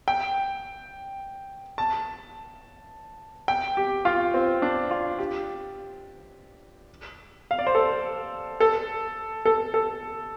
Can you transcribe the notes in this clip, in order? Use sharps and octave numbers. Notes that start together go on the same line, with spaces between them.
G5
A5
G5
G4
F4
C4
D4
F4
G4
F5
D5
C5
A4
A4
A4
A4